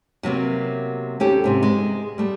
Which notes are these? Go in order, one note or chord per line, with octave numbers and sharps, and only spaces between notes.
C3 F#3 A#3 B3
D#2 C#4 G4 A4
G#2 C3 B3
G#3
G3 A3